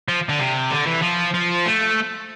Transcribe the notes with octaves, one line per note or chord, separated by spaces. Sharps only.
F3
D3
C3
D3
E3
F3
F3
A3